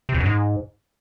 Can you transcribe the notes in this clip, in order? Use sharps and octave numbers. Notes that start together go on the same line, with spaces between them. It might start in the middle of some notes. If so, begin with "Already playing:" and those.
C3
E2
F#2
G#2